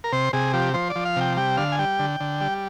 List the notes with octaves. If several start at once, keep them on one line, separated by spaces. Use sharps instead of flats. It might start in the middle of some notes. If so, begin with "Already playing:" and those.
A#4
C3 C5
C3 G#4
F3 G4
F3 C5
D5
F3
F5
C3 G5
G3 G5
D3 F5
G#5
G3 G5
D3
D3
G3